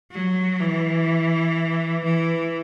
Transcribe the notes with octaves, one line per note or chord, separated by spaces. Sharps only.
F#3
E3
E3